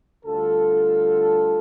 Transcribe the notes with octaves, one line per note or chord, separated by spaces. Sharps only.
D2 D3 G3 F4 A4